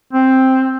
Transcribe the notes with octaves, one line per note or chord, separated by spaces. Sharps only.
C4